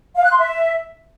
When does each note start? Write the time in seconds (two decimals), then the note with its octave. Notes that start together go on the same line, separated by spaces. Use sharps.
0.15 F5
0.23 F#6
0.30 C6
0.38 E5